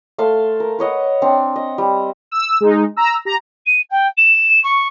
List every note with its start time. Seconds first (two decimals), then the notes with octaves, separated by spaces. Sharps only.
0.18 A3 A4 F5 C6
0.60 A#4
0.79 B4 C#5 D#5 F#5
1.22 C4 D4
1.56 D#5
1.78 G3
2.31 E6
2.61 G#3 D#4
2.97 A#5 E6
3.25 G4 A#5
3.66 D#7
3.90 G5
4.17 E7
4.63 C#6